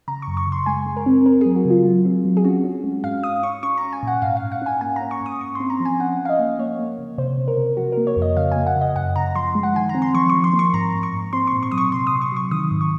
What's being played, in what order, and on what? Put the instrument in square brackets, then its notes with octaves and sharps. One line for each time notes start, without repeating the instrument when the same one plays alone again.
[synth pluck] C#3 A#5
C#6
F#2
C#6
C#3
C6
G#3 G#5
G#3
A#4
C4
C4 A#4
F#3 G#4
F#4
C#3
F4
F#3
C4
F#3
G#4
C#4 F#4
C#4
G#3
G#2 F5
C#4 D#6
C#4 C#6
C#4 C#6
A#5
C#4
G#5
A#2 F#5
G#2 F5
F5
G#2
F#5
C#4 G#5
A#3 G#5
C#4 A#5
C#6
G#2
D#6
G#2 C#6
C4 C6
A#5
F3
G#5
C#4 F#5
F3
F5
D#5
A#3
A#3 C#5
A#3
C#3
C3 C5
C3
A#4
C3
F3 F#4
A#4
A#3
C#5
F2
D#5
C#3 F5
A#3 G#5
F#5
C#3 D#5
F#2 F#5
C#3 A#5
F3 C6
G#3
F#5
D#3 G#5
A#5
C4
C6
F3 C#6
F3 C#6
C6
A#3
C#6
G#2 A#5
G#2
C#6
G#2
C4 C6
C#6
A#2
C#6
F#3 D#6
C#6
C3 C6
D#6
C3
C#6
F#3 C#6
D#3 D#6
G#2
C#6